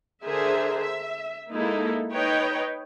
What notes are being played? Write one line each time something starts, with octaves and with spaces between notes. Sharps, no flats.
D3 G#4 A#4 C5 E5
E5
G#3 A#3 D#4 E4 A4
D#4 B4 C#5 D#5 G5